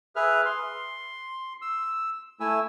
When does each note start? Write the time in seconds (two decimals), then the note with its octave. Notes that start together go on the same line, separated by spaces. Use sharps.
0.16 G#4 B4 E5 F6
0.46 C6
1.62 E6
2.40 A3 E4 G#5 E6